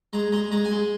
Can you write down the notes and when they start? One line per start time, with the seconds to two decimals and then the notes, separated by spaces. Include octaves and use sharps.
0.13 G#3 A#5
0.32 G#3 A#5
0.51 G#3 A#5
0.65 G#5
0.71 G#3